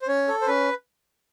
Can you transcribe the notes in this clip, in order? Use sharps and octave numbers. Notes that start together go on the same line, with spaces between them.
C5
C#4 C#5
A4
C5
C#4 B4